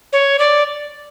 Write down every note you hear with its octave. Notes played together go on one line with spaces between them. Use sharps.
C#5
D5